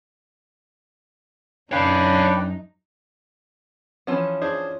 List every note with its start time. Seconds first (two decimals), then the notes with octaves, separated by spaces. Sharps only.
1.72 F#2 F#3 D4 D#4 B4 C#5 F5 G5
4.07 E3 F3 C#4
4.41 D4 G#4 C5